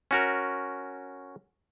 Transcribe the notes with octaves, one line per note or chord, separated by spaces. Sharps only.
C#4 F#4 A#4